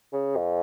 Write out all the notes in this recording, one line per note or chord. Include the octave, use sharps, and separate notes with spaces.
C#3
F2